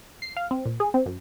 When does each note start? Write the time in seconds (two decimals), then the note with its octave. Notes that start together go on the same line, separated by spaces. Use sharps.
0.22 C7
0.37 F5
0.51 C4
0.65 A#2
0.80 G#4
0.94 C4
1.06 F#2